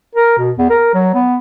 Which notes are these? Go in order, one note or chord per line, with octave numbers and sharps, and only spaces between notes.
A#4
B2
E2
A#4
F#3
B3